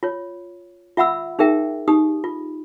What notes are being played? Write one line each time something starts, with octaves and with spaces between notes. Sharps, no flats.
F4 C#5
F4 E5 F#5 B5 E6
D#4 G#4 A#4 E5 G5
D#4 G4 D#6
F4